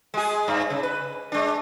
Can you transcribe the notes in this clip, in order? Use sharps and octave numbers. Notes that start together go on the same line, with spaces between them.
G#3 G#4
G2
C#3
B4
G#3 D4